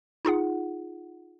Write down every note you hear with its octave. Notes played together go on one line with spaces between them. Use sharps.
D#4 F4 G#4 F#5